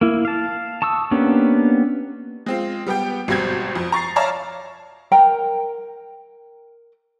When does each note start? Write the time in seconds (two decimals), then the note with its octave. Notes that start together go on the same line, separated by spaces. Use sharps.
0.01 A#3 E4
0.25 F5 A5
0.82 A5 C#6 D#6 E6
1.11 A#3 B3 C#4 D4 G4
2.46 G#3 C4 F4
2.86 G3 B3 G4 G5
3.28 G#1 B2 G3 C4 G6 G#6
3.75 F2
3.92 A#5 C#6 A6 C7
4.16 C#5 D5 E5 F5 A5 A#5
5.12 A#4 G5 A#5